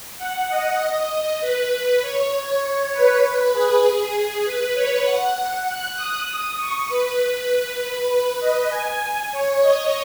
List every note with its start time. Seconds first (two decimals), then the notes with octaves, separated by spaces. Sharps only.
0.18 F#5
0.48 D#5
1.41 B4
1.71 B4
2.01 C#5
2.93 B4
3.23 B4
3.53 G#4
4.15 G#4
4.45 B4
4.74 C#5
5.05 F#5
5.67 F#6
5.96 D#6
6.57 C#6
6.88 B4
8.10 B4
8.40 D#5
8.70 G#5
9.32 C#5
9.62 D#5